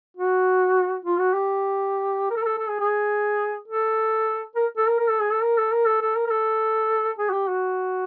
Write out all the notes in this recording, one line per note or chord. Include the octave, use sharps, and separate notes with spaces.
F#4
F4
F#4
G4
A#4
A4
A#4
A4
A4
G#4
G#4
A4
A#4
A4
A#4
A#4
A4
G#4
A4
A#4
A4
A#4
A4
A4
A#4
A#4
A4
G#4
F#4
G4
F#4